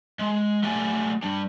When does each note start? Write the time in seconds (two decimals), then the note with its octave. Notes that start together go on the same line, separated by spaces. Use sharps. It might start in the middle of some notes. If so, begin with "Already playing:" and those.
0.19 G#3
0.63 F#3 A3 G4 D5 G#5
1.22 G3 D4